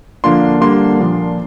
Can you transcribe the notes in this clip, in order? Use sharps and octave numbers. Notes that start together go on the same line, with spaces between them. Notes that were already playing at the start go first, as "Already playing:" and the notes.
D3 F3 A#3 D4 F4 C6
D3 G3 A#3 D4 C6
A#2 F3 D4